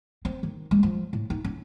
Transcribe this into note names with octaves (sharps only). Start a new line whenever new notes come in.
C4
D#3
G#3
F3
A2
D#4
C#4